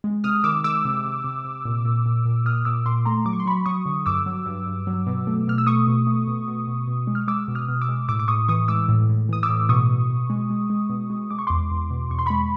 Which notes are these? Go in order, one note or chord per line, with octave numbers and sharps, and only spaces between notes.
G#3
C3 D#6 F6
D#3 D6 E6
G#3 D6 E6
C3
C3
C3
C3
A#2
A#2
A#2
A#2
A#2 D#6 F6
A#2 D6 E6
A#2 C6 D6
A3 A#5 C6
F#3 D6
C#6
C6
F#3 B5 C#6
F#3 C#6 D#6
D3
G2 D6 E6
F#3
G2
G2
F#3
B2
A3
B2 F6
E6
A3 C#6 D#6
B2
A3
B2
B2
B2
B2
G#3
F6
G#3 D6 E6
B2
D#6 F6
B2
D6 E6
G#3
A2 D6 E6
D6
A2 C#6 D#6
E3 C#6 D#6
G#3 D6 E6
A2
A2
E3 D#6
D6 E6
A2
B2 C#6 D#6
B2
B2
G#3
G#3
G#3
B2
G#3
G#3 D6
C#6
E2 C6 D6
E2
B2
E2 C#6
C6
G#3 B5 C#6